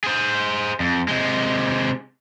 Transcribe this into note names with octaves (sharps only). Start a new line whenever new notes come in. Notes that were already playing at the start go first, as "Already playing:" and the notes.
G#4 C5
F2
C3 G#3